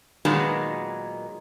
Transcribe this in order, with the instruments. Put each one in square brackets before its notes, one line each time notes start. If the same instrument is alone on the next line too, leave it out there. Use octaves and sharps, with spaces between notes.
[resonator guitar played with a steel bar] A#2 D#3 F#3 G#3 B3